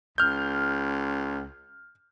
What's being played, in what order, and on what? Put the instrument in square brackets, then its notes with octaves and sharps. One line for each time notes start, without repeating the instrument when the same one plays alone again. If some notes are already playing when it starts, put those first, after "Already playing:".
[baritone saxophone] C#2 [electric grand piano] F6 G6